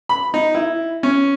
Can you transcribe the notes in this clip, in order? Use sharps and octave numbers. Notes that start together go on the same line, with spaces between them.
B5
D#4
E4
C#4